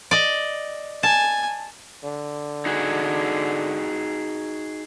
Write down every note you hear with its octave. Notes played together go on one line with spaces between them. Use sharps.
D5 D#5
G#5 A5
D3
D#4 F#4 G#4